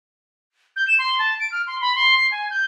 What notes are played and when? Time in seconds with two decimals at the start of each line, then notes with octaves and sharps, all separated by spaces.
0.76 G6
0.88 E7
0.99 C6
1.19 A5
1.40 D7
1.52 F6
1.67 C6
1.81 B5
1.96 C6
2.18 C7
2.31 G#5
2.50 G6